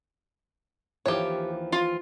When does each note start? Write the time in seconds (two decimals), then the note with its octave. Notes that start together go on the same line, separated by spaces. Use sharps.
1.06 D#2 E3 F3 G4 C#5
1.72 F4